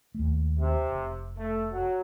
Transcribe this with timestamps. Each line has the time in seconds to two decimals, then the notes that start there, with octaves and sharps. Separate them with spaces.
0.15 D#2 A3
0.58 C3
0.92 F1
1.38 A3
1.72 F#3